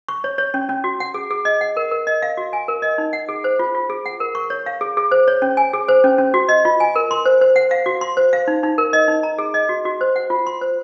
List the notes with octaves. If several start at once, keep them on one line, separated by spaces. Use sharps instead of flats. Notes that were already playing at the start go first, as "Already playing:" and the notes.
C#6
C#5
C#5
C#4
C#4
F#4
F#5
G#4
G#4
D#5
F#5
A#4
A#4
D#5
F5
F#4
G#5
A#4
D#5
D#4
F#5
G#4
C5
F4
F4
G#4
F#5
A#4
C#6
C#5
F5
G#4
G#4
C5
C#5
C#4
G#5
G#4
C5
C#4
C#4
F#4
D#5
F4
G#5
A#4
C6
C5
C5
F#5
F5
F#4
C6
C5
F5
D#4
D#4
A#4
D#5
D#4
A#5
G#4
D#5
F#4
F#4
C5
F#5
F4
C6
C5